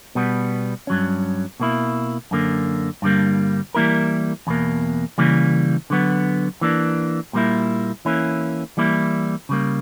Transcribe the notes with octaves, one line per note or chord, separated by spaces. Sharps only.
B2 G3 B3
G2 F#3 C#4
B2 A#3 E4
F#2 D3 A#3
G2 D3 G3 A#3
E3 G3 A#3 E4 A#4
E2 B2 A#3
C#3 E3 G3 A#3
D3 F#3 B3
E3 A#3 D4
A#2 G3 A#3 E4
E3 A#3 C#4 E4
E3 G3 A#3 E4
C#3 G3 A#3